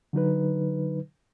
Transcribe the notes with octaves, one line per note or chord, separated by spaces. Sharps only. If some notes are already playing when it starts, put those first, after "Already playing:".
D3 F#3 D#4 B4